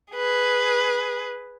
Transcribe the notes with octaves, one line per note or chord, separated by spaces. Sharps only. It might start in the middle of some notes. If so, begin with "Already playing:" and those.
G#4 B4